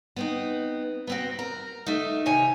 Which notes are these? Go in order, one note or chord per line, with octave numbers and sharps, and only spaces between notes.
B3 C4 D#4
B3 C4 F#4
A#4
A3 D#4
C3 D#3 C#5 G#5